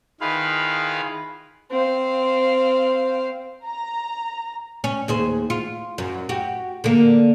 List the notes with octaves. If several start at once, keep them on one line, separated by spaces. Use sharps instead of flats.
D#3 E4 F4 G#4 B4 F5
C4 F5
A#5
C#4
D#2 G#4 C5
F4
F#2
F#4 G4
D3 A#3